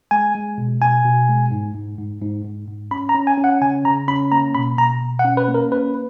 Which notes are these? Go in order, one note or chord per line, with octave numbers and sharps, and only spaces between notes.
G#3 G#5
G#3
B2
B2 G#5
B2
G#3
G#2
G#2
G#2
G#2
G#2
G#2
C#4 B5
A#5
C#4
G#5
C#4
F#5
C#3 G#5
C#3 A#5
C#4 B5
A#3 A#5
B2 B5
B2 A#5
B2
F#5
C#4
B4
A#3
A#4
C#4 B4